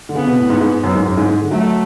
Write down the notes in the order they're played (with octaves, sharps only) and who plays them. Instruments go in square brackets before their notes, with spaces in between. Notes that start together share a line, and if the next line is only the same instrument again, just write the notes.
[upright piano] D3
[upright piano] C#3 [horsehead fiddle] B3
[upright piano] B2
A2
G#2
G#2
F#2
G#2
F#2
G#2
G#2
D3
[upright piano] F#3 [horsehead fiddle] A3